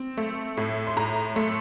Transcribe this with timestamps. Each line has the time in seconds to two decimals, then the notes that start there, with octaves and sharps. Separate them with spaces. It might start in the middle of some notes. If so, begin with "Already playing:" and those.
Already playing: C4
0.17 A3
0.57 A2
0.87 C6
0.97 A2 A#5
1.36 A3 C6